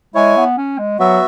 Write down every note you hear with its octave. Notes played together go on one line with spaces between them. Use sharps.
G#3 E4 C#5 G#5
B3
C#4
G#3
F#3 B3 F#4 E5